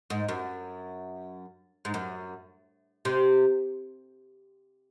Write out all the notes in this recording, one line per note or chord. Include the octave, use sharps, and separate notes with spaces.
G#2
F#2
G#2
F#2
C3